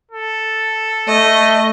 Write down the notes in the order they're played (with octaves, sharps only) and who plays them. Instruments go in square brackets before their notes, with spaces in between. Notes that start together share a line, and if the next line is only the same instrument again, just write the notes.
[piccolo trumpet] A4
[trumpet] A3 [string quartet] D#5